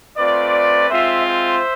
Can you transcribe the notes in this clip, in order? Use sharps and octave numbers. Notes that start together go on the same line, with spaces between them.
A3 C4 F4 B4 D5
G#3 C4 F4 C5 E5
C5 E5